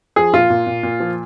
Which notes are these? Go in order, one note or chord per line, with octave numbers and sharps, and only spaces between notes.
F3 G#4
A#2 F4
A#2
A#2
A#2
F3